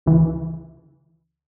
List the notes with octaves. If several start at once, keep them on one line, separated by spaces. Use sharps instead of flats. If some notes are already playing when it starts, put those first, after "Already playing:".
C#2 C#3 E3